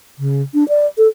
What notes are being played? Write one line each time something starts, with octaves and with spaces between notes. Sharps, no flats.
C#3
D4
D5
A4